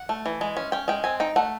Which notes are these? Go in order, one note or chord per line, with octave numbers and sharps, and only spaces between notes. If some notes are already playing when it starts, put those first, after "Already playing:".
Already playing: F#5
A3
E3
G#3
C#4
C#4 G5
G#3 G5
C4 G#5
D#4 G5
A3 F#5